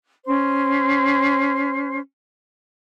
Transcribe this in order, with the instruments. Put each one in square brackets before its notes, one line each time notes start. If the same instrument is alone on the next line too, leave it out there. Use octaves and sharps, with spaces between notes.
[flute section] C#4 C5